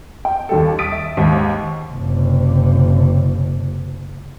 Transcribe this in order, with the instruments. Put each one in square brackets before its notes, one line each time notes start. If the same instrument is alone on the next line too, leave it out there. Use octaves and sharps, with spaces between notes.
[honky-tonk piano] G5
D#2 G3 A4
D#6 A6 B6 D7
E5
D#2 G#2
[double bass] F#1 C3